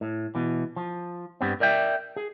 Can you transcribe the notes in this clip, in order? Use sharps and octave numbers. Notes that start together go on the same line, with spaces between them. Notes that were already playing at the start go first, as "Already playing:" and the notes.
A2
B2 E3
F3
G2 G3 B3 C4
A#4 D5 E5 G5
G#4